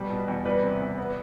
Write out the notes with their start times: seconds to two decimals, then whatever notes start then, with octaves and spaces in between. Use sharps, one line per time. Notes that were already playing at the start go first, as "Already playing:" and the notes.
Already playing: B2 G3 B4 D5
0.10 B2
0.28 E2
0.45 G3 B4 D5
0.63 C3
0.81 E2
0.98 B3